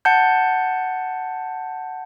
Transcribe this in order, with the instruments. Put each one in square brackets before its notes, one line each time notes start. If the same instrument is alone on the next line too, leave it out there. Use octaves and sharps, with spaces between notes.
[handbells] F#5 A5 G6